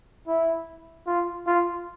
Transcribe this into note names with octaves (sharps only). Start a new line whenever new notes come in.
E4
F4
F4